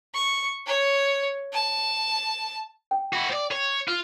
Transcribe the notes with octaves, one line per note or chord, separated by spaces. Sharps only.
C#6
C#5
A5
G5
E4 F#4
C5 D5
C#5
F4 F6